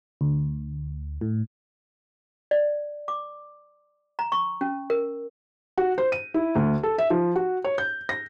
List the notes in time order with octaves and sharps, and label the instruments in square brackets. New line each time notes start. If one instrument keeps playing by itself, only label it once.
[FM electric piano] D2
A2
[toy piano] D5
D6
A#5
C#6
C#4
A#4
[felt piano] F#4
C5
D#7
E4
D2
A4
E5
F3
F#4
C#5
G6
A#6